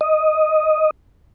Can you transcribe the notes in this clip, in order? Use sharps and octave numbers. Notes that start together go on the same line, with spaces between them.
D#5